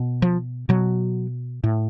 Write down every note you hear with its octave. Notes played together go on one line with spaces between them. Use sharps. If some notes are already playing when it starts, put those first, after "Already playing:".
Already playing: B2
F3
B2 F#3
A2